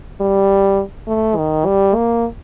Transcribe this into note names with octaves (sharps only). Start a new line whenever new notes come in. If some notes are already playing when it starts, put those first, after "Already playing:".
G3
A3
D#3
G3
A#3